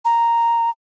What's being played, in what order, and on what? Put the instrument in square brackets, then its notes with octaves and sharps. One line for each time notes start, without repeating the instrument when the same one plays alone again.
[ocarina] A#5